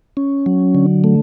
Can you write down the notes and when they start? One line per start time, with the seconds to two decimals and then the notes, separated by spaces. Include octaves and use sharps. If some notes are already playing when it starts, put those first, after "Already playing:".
0.17 C#4
0.46 F#3
0.75 D3
1.04 A3